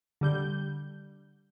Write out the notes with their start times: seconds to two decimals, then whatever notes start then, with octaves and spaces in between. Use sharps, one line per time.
0.21 D3 G3 G6